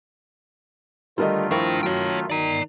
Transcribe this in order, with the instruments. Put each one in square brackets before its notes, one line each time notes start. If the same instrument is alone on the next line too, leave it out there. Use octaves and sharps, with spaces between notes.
[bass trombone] D3 [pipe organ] D#3 A3 F4 [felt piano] G3 A#4 D#5
[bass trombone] F3 [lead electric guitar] D4 G5 [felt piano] E4 A#4 C#6
[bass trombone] F#2 [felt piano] F#3 [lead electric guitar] C#5 G5
[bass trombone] D#3 [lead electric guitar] D5 A#5